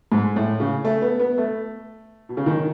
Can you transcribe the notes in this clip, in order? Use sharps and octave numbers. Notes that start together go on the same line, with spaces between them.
G#2
A2
C#3
A3
B3
B3
A3
B2
C#3
D#3